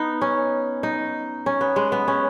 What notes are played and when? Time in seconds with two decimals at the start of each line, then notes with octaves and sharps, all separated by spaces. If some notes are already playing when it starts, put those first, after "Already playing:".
Already playing: B3 D#4
0.21 C#4
0.83 D#4
1.46 C#4
1.61 B3
1.76 G#3
1.92 B3
2.08 C#4